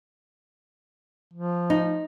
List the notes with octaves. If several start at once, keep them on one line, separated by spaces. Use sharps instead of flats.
F3
D#4